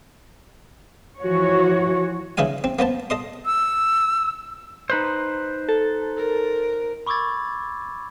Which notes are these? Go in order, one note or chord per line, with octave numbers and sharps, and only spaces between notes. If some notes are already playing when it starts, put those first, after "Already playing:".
E3 F3 F#4 C#5
C#3 E3 D#4 F5 G#5
C4
A#3 B3 C5 A5
A4 D#5 C6
E6
D#4 B4 C5
A4
A#4
B5 C#6 D6 E6 G#6 A6